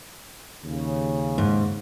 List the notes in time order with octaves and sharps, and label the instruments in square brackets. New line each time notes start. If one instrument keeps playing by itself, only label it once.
[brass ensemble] D#2 C#3
[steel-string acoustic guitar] G#2